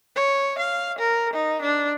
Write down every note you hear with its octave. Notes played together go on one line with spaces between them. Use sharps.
C#5
F5
A#4
D#4
D4